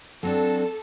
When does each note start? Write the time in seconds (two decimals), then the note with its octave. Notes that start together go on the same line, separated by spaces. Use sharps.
0.23 F#3 C4 D4 A4